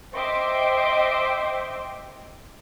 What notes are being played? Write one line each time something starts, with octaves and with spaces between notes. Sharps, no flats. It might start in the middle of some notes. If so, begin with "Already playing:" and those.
C5 D#5 E5 G5 C6 D6